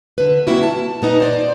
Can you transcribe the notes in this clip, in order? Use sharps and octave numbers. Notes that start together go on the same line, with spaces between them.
D3 B4
G3 A#3 C4 E4 F#4
A5
A#2 B3 D#4
C5 D5